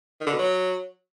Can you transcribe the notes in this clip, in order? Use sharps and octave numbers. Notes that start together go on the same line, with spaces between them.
D#3
D3
B2
F#3